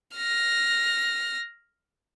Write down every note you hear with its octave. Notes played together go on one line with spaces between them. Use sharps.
F6 A#6